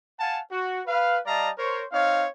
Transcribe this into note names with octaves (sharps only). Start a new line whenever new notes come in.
F5 F#5 G#5 A5
F#4
B4 F5
G3 D5 D#5 F5 A5 A#5
A#4 C5 C#5
C4 D#4 C#5 F5